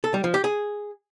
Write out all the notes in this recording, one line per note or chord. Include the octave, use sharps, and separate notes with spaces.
A4
G3
F3
G4
G#4